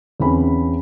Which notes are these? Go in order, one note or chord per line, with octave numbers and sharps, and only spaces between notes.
E2 C4 C#4 B5